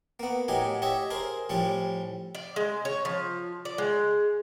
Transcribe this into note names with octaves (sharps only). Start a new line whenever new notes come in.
A#3 B3
A2 F#3 D#4 G4 G#5
G4 C#5 D#5 E5
G#4 A#4 C5
A2 F3 G3 C#4
D5
G#3
C#5
F3
D5
G#3